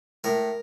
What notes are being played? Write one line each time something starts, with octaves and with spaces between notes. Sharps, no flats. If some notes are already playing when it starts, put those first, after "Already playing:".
A2 A#4